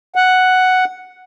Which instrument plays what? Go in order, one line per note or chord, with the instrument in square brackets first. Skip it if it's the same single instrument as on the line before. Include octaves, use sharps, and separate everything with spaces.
[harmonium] F#5